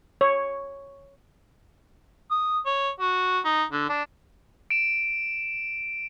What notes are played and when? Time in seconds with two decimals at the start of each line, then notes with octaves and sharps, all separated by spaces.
0.21 C#5
2.31 D#6
2.66 C#5
3.00 F#4
3.45 D#4
3.71 D3
3.90 D4
4.70 D7 E7